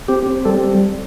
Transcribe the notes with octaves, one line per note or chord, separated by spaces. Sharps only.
C4 G4
C4
G3 A4